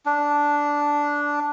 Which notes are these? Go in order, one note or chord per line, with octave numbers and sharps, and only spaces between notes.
D4